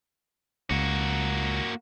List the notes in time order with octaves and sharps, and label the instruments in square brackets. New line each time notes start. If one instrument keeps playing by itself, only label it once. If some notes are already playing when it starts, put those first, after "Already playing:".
[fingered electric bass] C#2 [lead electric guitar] A#3 F#4